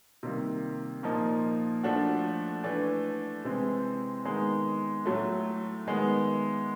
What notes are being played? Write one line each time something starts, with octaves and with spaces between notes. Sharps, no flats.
C3 D#3 G3 A#3
A#2 F3 A#3 D#4
F3 A3 D4 F#4
E3 A3 D4
C3 E3 G#3 C4
D#3 G#3 B3 D#4
A2 F#3 A3
D#3 G#3 B3